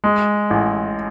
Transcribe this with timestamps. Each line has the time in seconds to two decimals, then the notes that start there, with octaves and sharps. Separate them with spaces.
0.04 G#3
0.50 A1